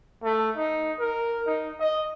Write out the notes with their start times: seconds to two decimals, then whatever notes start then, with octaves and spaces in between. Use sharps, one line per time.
0.24 A3
0.56 D#4
0.99 A#4
1.46 D#4
1.80 D#5